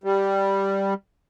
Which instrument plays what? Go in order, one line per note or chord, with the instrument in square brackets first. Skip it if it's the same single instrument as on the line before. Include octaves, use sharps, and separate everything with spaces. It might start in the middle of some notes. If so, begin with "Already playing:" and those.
[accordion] G3